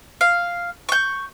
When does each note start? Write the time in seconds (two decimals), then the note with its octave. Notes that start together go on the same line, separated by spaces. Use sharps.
0.21 F5
0.89 C#6 G6